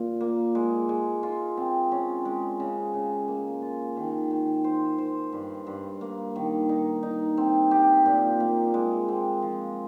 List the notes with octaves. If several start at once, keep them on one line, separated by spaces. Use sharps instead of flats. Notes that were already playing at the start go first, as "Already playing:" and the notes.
Already playing: A#2
A#3
G#3
G#3
F4
C4
C#4
G#3
C#3
C#3
A#3
F4
D#3
D#3
C5
C5
G2
G2
A#3
D#3
D#4
D#4
C4
G4
A#2
A#3
G#3
C4
F3